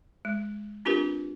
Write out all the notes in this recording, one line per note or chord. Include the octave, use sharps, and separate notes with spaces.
G#3
C4 D4 F4 G4 A#4 B4